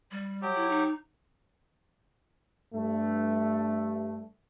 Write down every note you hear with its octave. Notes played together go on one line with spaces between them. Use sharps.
G3
F#3 G4
E4
D#4
G2 A3